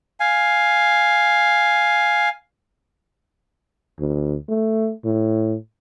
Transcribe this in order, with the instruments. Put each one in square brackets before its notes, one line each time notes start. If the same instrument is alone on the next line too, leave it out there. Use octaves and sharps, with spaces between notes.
[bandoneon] F5 G#5
[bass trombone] D2
A3
A2